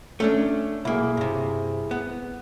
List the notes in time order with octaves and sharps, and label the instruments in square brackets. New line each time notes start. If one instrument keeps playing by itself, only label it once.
[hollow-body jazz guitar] A3 C#4 D4
[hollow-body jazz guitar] B1 A#3 [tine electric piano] E4 G#4
[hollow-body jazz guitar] G2 C3
B3